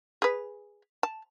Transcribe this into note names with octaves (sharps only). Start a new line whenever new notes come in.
G#4 B4
A5